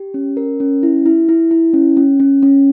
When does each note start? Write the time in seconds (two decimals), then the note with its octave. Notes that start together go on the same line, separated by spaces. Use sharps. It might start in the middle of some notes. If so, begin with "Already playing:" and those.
Already playing: G4
0.14 C#4
0.37 A#4
0.60 C#4
0.83 E4
1.06 E4
1.29 E4
1.51 E4
1.74 C#4
1.97 C#4
2.20 C#4
2.43 C#4